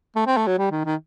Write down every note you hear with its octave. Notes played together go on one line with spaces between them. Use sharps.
A3
C4
A3
F#3
G3
D#3
D#3